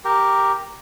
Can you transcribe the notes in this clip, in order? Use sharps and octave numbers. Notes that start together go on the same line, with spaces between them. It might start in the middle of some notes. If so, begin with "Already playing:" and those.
G4 A#4